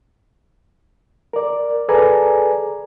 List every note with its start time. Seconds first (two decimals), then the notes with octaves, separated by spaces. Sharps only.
1.33 A#4 D5
1.88 G#4 A4 B4 D5 G#5 A#5